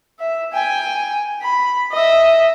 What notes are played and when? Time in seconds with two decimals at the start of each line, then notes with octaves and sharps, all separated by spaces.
0.19 E5
0.53 G5 G#5
1.42 B5
1.91 D#5 E5